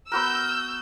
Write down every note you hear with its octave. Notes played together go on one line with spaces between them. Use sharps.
B3 F#4 A#4 E6 G6